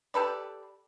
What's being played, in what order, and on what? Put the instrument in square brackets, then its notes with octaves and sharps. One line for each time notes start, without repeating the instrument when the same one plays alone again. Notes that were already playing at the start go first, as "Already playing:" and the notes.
[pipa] G4 A4 B4 D5